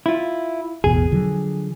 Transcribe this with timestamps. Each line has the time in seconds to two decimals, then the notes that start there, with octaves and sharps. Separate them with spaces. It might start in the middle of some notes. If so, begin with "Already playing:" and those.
0.06 E4 F4
0.84 A1 E2 B2 G#4
1.12 D3 F3 F#3